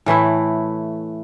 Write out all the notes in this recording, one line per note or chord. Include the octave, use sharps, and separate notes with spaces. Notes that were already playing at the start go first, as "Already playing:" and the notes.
A2 E3 A3 E4